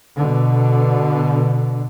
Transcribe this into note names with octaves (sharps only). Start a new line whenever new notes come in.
B2 D3